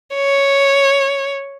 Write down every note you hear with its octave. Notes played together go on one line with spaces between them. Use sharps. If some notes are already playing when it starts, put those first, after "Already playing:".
C#5